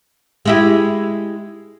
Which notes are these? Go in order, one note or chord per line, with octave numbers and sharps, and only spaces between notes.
G#3 E4 G4